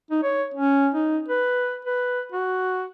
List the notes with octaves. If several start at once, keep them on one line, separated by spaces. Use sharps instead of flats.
D#4
C#5
C#4
D#4
B4
B4
F#4